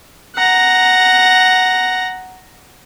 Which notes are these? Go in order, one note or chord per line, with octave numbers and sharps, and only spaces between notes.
F#5 A#5